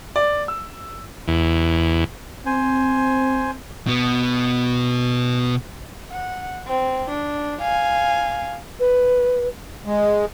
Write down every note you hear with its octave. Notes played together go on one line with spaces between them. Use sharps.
D5
E6
E2
C4 C5 G#5
B2 B3
F#5
C4
D4
F5 G#5
B4
G#3